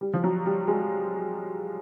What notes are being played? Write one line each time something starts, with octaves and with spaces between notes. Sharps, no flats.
G3
F3
F#3
G3
G#3